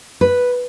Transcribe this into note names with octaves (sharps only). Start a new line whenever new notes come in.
B4